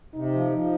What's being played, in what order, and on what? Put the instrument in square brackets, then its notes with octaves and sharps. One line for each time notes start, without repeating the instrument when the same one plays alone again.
[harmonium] C3 [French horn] D#4
[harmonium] F3
F3